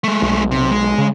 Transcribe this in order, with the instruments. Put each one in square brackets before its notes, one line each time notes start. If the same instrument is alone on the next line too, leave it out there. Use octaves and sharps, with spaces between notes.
[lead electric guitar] G#3 A3
[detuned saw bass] B1
[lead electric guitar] C3
G#3
[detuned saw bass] C#3